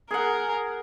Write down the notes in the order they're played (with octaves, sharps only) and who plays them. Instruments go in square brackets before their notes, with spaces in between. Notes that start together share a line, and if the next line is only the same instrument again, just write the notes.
[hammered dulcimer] G#4 F#5 [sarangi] A#4